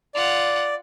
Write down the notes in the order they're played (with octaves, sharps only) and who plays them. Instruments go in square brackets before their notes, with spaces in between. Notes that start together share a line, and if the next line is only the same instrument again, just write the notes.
[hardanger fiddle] F4 F#5 [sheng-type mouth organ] D5